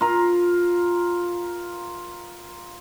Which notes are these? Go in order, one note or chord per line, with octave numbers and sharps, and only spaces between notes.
F4 A#4